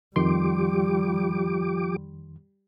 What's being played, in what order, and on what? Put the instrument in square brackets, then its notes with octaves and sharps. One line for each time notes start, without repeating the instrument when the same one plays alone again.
[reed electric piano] F2 D#3 C6 [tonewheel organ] F3 G4 D6 [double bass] G3